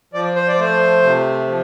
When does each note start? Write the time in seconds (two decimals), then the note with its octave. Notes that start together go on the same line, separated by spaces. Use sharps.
0.13 F3 D5
0.36 C5
0.48 D5
0.59 A3 C5
1.03 C3
1.47 F3